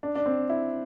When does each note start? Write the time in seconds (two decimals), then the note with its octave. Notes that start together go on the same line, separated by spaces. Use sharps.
0.03 D4
0.15 D4
0.26 C4
0.50 E4